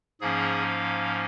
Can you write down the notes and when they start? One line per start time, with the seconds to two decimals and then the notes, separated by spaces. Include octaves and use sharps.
0.21 G#2 F3 A#3 C#4 G#4
0.68 F5